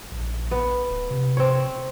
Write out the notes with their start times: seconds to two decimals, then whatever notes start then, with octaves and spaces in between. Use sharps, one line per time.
0.11 A#1
0.51 B3
0.87 D1
1.10 C3
1.37 C4 C#5